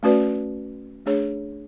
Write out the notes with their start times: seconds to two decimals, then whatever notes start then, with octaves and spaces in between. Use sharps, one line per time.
0.03 A3 C#4 F#4 B4 D5
1.06 A3 D4 G#4 C#5